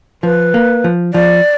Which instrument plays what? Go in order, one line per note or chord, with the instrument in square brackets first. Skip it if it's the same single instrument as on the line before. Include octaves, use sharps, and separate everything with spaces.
[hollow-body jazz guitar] F3 [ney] B4
[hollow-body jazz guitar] A#3
F3
[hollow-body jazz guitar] F3 [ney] D5